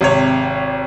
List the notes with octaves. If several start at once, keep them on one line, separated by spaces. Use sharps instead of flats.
G#1 C3 C#5